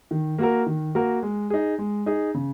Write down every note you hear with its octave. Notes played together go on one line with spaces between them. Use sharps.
D#3
A#3 F#4 A#4
D#3
A#3 F#4 A#4
G#3
D#4 G#4
G#3
D#4 G#4
C#3